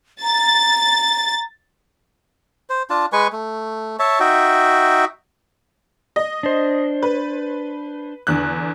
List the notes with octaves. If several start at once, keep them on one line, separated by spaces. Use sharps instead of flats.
A#5 A6
C5
D4 F4 A5
G#3 B4 G#5 C#6
A3
C#5 E5 A5
D#4 F#4 E5 G5
D#5
D4 C5
B4
E2 D3 F#6